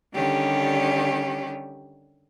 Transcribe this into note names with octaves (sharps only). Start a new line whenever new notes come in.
D3 D#3 G3 C#4 G4